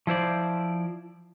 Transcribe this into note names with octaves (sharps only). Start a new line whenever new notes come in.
F3 E4 C5 D5